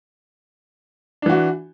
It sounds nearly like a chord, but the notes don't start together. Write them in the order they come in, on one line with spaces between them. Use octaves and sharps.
D4 E3 F#4